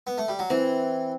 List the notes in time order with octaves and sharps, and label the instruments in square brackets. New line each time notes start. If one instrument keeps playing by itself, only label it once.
[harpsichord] B3
A3
G3
F#3
[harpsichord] E3 [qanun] C4